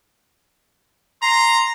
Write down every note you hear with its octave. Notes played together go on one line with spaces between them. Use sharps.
A#5 C6